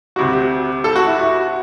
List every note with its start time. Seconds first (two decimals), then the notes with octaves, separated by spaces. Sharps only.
0.16 D2 C3 G3 F#4
0.33 G4
0.84 A4
0.96 F#4
1.07 E4
1.19 F#4